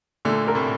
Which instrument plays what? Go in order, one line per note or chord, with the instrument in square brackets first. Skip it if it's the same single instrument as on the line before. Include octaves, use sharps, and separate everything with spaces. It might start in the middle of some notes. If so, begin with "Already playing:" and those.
[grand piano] A#2 D3 [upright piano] A3
[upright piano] A#4
[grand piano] A2 C3